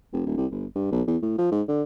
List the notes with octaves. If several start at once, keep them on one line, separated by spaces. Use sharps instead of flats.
F1
D#1
C2
G1
G2
B1
E2
A2
F3
G#2
D3